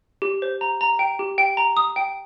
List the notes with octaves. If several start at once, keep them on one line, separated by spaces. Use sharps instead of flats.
G4
C5
A#5
A#5
G5
G4
G5
A#5
D#6
G5